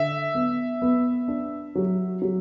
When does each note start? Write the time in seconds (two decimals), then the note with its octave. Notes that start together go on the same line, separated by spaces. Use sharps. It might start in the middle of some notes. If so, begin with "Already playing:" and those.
Already playing: D3 E5
0.35 B3
0.82 B3
1.28 D4
1.75 F#3
2.22 F#3